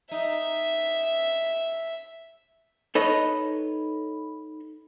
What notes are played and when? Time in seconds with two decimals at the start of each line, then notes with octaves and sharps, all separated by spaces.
0.12 D#4 E5
2.95 D#4 A4 B4 C#5 D#5